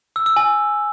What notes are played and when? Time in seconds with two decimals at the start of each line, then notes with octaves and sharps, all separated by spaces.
0.16 E6
0.26 E6
0.36 G#5